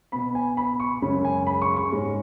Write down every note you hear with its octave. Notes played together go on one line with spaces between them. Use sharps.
B2 B3 B5
G#5
B5
C#6
F#2 C#3 G#3 C#4 B5
G#5
B5
C#6
C#6
G#2 G#3 C#4